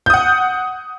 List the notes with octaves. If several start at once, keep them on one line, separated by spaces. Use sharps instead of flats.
F#5 D#6 G6